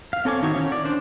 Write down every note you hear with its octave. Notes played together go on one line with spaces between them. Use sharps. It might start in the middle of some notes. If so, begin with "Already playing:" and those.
F5
C4 A4 C#5 G#5 D6
D#3 D#4 E4 F#4 C#5
C#4
D5
D4 C5 D5